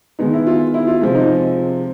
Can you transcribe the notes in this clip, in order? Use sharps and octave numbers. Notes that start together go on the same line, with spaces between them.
D#3 G#3 B3 D#4
E4
F4
E4
F4
C3 F3 G#3
D#4